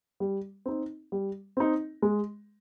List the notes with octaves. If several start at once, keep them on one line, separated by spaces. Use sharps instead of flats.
G3
C4 D#4
G3
C4 D#4
G#3